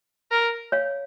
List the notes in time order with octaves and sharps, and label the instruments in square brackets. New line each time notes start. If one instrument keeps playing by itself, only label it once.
[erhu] A#4
[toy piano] C#5 F5